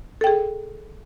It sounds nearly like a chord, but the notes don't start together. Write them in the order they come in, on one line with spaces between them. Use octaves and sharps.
A4 G5 G#4